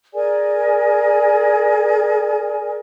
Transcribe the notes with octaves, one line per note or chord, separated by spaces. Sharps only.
G#4 A#4 D5 G#5